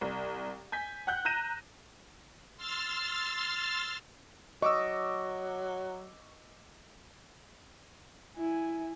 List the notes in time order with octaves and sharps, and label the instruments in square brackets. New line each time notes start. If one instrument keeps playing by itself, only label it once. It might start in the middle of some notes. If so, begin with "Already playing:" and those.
[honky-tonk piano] C2
G#5 G6 B6
F#5 G5 F#6 G6
A#5 F#6 G6 A#6 D#7 E7
[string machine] C6 E6 F6 A6
[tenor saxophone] F#3 [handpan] D#5 [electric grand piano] C#6 D6 E6
[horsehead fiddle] E4 G#5